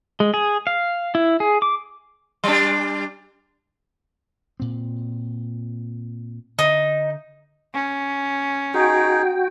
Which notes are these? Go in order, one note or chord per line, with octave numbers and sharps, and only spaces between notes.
G#3
G#4
F5
E4
G#4
D6
G3 D4
A#2 C4
D3 D#4
C#4
D#4 F#4 G#4 G5